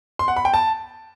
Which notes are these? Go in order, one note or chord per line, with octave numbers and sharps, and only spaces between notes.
C6
F#5
B5
G5
A5